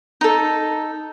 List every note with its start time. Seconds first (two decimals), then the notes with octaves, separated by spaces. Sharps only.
0.21 D#4 A4